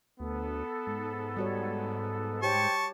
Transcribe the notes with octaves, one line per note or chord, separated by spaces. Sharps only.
D2 B3 A4
G#2
G3 F#4 C#5
G4 C5 C#5 G5 A5 C#6